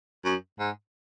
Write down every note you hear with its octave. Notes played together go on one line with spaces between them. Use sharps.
F#2
G#2